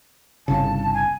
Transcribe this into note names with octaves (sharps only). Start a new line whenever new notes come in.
G1 C2 C#3 A5
G#5